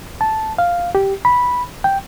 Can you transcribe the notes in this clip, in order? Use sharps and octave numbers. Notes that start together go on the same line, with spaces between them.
A5
F5
G4
B5
G5